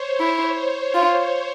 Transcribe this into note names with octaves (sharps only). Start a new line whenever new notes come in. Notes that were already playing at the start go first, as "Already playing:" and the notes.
Already playing: C5 C#5
E4 C#5
F4